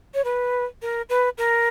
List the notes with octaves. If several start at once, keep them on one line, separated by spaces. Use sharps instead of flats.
C#5
B4
A#4
B4
A#4